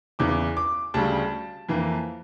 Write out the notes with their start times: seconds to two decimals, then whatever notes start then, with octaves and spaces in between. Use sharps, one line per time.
0.19 E2 C#3 E3 D6
0.57 D6
0.94 D2 C#3 G3 A5
1.69 F2 E3 A#3